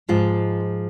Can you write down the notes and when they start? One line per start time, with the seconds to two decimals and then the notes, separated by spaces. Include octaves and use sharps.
0.09 G#2 F3 G#3 F4